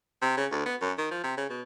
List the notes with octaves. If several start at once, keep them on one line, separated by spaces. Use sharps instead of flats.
C3
C#3
D2
B3
F#2
D#3
F3
C3
C#3
B2